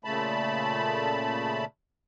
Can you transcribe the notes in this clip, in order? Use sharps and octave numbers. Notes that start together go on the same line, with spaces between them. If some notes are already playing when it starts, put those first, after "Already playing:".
A#2 C#3 A3 A5 B5